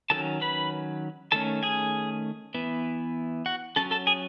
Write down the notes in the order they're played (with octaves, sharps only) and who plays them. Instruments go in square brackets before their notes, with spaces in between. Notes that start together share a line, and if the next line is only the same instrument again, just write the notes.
[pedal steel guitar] D#3 F#3 C#4 A4 A5
B4 B5
D#3 A3 C#4 A4 A5
G#4 G#5
E3 B3
F#4 F#5
F#3 C#4 A4 A5
A4 A5
G#4 G#5